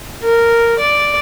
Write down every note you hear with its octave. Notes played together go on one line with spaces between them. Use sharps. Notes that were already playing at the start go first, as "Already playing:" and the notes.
A#4
D5